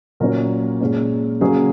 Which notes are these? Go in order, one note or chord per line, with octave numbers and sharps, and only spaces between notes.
A#2 F#3 C#4 A#4
A#2 G#3 C#4
C#3 F#3 A#3 C#4 G#4